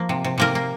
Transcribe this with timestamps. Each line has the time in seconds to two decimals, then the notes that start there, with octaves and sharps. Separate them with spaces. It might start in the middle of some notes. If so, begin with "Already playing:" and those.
Already playing: F3 A#3
0.09 C3
0.24 C3
0.38 C3 A#3 A#4
0.55 A#3